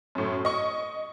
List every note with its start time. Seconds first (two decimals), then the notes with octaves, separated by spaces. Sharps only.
0.15 F#2 A2
0.45 D#5 C#6